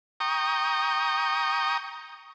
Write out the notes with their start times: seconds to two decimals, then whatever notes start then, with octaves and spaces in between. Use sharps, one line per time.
0.20 G5 A#5 C#6 D#6